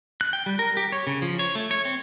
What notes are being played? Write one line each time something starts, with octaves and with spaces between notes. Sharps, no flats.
F#6
G5
G3
A#4
G4
C#5
C#3
F3
C#5
A3
C#5
C4